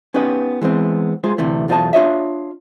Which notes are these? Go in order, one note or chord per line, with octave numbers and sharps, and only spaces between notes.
B3 C#4 D#4 G4 B4 D#5
E3 G#3 B3 C4
G#3 F4 G#4 C5
D2 C3 E3 A3
B1 E2 F4 C5 D#5 A5
D4 F4 C#5 D#5 E5